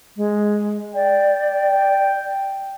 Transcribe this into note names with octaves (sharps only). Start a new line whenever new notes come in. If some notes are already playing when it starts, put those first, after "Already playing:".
G#3
D5 G5